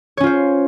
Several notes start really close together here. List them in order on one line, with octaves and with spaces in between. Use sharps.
C#5 C#4 F4 C5